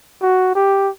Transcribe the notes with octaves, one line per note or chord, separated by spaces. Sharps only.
F#4
G4